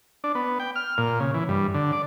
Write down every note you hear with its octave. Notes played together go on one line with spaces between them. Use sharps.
D4
B3
G5
F6
A#2
C#3
E3
G2
D3
D5